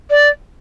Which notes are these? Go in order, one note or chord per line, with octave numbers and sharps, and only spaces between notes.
D5